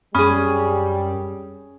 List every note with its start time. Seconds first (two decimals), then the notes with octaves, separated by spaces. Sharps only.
0.15 F#2 G3 C#4 G#4 B5 D#6 F6